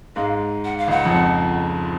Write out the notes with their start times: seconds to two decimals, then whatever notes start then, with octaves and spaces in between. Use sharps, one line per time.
0.16 G#2 G#3 F5
0.65 F#5
0.78 F5
0.88 C#2 C#3 F#5
1.05 F2 F3